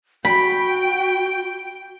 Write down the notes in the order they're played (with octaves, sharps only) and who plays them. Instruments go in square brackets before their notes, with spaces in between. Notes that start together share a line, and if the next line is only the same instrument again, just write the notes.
[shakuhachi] F#4 [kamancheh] G5 [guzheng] B5